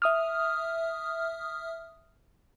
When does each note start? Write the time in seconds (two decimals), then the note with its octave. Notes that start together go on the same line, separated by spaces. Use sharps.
0.02 E5 D#6 F6